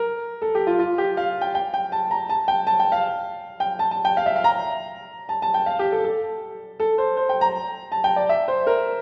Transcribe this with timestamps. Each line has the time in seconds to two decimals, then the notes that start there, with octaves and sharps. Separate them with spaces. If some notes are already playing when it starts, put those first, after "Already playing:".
Already playing: A#4
0.42 A4
0.55 G4
0.67 F4
0.79 F4
0.98 G4
1.17 F5
1.41 G5
1.55 G5
1.74 G5
1.92 A5
2.11 A#5
2.29 A5
2.48 G5
2.67 A5
2.79 G5
2.92 F5
3.60 G5
3.79 A5
3.91 A5
4.05 G5
4.17 F5
4.26 E5
4.36 F5
4.44 A#5
5.29 A5
5.42 A5
5.54 G5
5.66 F5
5.79 G4
5.92 A4
6.04 A4
6.80 A4
6.98 C5
7.17 C5
7.29 G5
7.41 A#5
7.92 A5
8.04 G5
8.16 D5
8.29 E5
8.48 C5
8.67 A#4